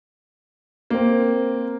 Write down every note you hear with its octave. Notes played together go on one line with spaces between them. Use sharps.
A#3 C4